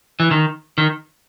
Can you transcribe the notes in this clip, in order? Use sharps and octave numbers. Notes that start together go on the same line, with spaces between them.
E3
D#3
D#3